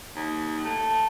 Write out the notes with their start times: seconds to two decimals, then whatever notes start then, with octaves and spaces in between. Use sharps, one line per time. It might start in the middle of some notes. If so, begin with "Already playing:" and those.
0.16 D#2
0.65 A3